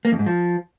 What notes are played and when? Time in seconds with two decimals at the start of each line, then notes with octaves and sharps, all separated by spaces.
0.05 A#3
0.12 F2
0.19 G#2
0.26 F3